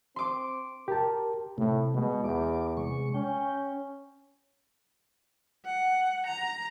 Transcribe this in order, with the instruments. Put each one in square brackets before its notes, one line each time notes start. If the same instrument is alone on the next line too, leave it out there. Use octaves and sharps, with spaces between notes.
[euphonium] C4 [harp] C6 D6
[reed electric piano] G4 A5 [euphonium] A#4
[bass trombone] A2 [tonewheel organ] C3 A3
[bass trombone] B2 [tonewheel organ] G#3
[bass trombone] E2 [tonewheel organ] D6
[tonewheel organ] C3 G#3 C#6
[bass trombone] C#4 [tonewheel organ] G5
[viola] F#5
A#5